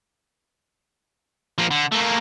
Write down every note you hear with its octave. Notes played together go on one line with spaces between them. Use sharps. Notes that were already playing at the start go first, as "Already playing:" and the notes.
F3 A#3
D3
A3 A#3